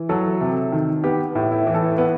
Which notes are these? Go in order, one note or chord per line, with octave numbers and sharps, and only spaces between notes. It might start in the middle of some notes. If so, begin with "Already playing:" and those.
Already playing: E3
F#3 A4
C3
D#3
B3 G4
A2
E4
E3
A4
B3